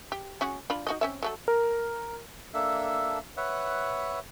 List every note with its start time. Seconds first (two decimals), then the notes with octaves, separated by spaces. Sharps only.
0.12 G4
0.41 C#4 F#4 G#4
0.70 D4 F4 B5
0.87 D#4 F#4 D#5
1.01 C4 C#4 E5
1.22 F#3 A3 A4
1.48 A#4
2.54 A#3 D4 A4 E5
3.37 B4 C#5 E5 F#5